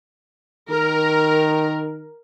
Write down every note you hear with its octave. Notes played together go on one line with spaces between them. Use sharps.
D#3 A#4